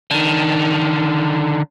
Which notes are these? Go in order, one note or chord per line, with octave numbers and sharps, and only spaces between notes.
D3 D#3